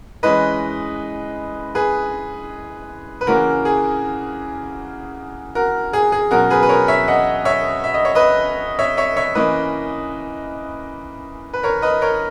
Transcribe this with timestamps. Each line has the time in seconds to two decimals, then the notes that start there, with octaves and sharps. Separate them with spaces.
0.23 E3 G#3 C#4 B4 D#5
1.75 G#4 B4
3.21 B4
3.27 C#3 E3 A#3 C#4 F#4 A#4
3.65 G#4
5.55 F#4 A#4
5.93 G#4
6.12 G#4
6.31 B2 F#3 C#4 F#4 A#4
6.50 G#4 B4
6.62 B4
6.69 A#4 C#5
6.88 C#5 E5
7.08 D#5 F#5
7.45 C#5 E5
7.84 E5
7.94 D#5
8.05 C#5
8.15 B4 D#5
8.79 C#5 E5
8.97 C#5 E5
9.16 C#5 E5
9.35 E3 A#3 C#4 B4 D#5
11.53 B4
11.63 A#4 C#5
11.82 B4 D#5
12.02 A#4 C#5